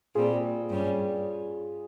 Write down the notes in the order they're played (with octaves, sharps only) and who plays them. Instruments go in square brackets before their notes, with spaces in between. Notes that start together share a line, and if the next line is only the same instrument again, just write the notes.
[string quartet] A#2 G3 C4 [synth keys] F4 G#4
[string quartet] G2 G3 C#4